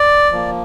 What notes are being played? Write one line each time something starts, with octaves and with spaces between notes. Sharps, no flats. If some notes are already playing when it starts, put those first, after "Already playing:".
Already playing: D5
F3 A#3